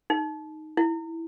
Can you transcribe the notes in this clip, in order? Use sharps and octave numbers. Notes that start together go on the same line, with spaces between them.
D#4
E4